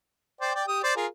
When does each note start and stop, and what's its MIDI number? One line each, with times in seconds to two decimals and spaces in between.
0.41 0.52 72
0.41 0.52 74
0.41 0.52 79
0.55 0.63 74
0.55 0.63 79
0.68 0.79 67
0.68 0.79 87
0.83 0.95 72
0.83 0.95 74
0.96 1.06 65
0.96 1.06 68
0.96 1.06 70